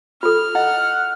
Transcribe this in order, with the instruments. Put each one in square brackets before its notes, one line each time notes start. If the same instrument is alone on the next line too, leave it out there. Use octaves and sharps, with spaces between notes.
[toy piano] F4 A4 [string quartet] F6
[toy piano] E4 D#5 [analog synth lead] F#5